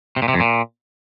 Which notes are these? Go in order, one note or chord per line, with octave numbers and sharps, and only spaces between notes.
C3
A#2
C3
F2
A#2